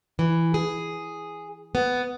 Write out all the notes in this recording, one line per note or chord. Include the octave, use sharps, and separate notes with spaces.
E3
G#4
B3